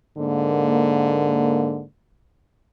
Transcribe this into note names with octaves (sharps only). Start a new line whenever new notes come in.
G#2 D3 A#3